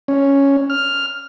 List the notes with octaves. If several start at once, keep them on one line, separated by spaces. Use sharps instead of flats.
C#4
F6